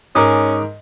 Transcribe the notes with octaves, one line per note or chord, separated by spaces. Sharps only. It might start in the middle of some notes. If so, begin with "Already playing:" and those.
G#2 C#4 A#4 A#5 D6 D#6